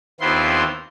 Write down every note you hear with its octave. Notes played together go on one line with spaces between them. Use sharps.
D#2 B3 C4 E4 F4 C6